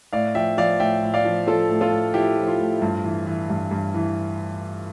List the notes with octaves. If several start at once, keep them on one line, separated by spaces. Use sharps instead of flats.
A2 D5 F5
F3 E5 G5
F3 D5 F5
A2 E5 G5
A2
D5 F5
F3
F3 F4 A4
A2
F4 A4
A2
F3 E4 G4
F3
F4
A2
G2
E3
E3
G2
G2
E3